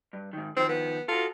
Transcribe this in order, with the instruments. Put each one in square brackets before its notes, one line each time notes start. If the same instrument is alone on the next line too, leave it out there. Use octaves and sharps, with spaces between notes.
[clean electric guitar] G2
G#2 D#3
[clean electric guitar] D#3 F3 [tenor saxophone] C4
[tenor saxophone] B3
[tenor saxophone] F4 [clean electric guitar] F#4 A4